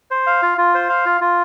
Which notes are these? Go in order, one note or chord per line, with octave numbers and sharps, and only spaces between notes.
C5
F5
F4
F4
C5
F5
F4
F4